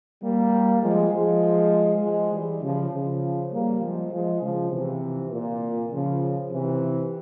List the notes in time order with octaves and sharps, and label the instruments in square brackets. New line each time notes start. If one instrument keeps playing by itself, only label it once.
[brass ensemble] G3 A#3
F3 G#3
F3 G#3
F3 G#3
E3 G3
C#3 F3
C#3 F3
G3 A#3
F3 G#3
F3 G#3
C#3 F3
C3 E3
A#2
C#3 F3
C3 E3